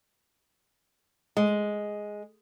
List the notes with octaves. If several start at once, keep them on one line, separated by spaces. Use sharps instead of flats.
G#3